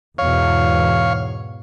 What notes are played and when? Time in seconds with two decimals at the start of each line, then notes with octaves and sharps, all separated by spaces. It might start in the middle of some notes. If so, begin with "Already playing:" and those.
0.18 E2 G#2 B2 C#5 F5